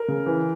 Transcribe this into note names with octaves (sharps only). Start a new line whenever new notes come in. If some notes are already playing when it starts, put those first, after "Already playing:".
Already playing: A#4
C#3
E3